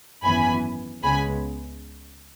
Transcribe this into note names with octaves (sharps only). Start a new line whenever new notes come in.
G#1 F#2 E3 B3 G#5 B5
C#2 C#3 G#3 B3 G#5 B5